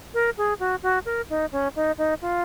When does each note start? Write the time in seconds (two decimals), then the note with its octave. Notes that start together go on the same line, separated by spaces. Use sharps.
0.14 A#4
0.37 G#4
0.60 F#4
0.83 F#4
1.06 A#4
1.30 D#4
1.52 C#4
1.76 D#4
1.98 D#4
2.21 F4